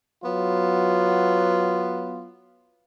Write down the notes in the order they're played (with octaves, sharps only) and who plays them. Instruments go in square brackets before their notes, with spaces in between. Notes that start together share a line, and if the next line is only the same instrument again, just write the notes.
[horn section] F#3 B3 F4